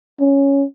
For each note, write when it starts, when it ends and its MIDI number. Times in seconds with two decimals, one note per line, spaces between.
0.20 0.64 61